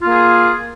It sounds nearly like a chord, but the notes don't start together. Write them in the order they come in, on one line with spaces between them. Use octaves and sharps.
F4 A#3 G#4